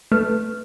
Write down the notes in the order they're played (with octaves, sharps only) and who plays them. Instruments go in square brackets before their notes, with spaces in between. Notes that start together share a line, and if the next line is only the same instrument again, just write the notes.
[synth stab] A3 [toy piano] B4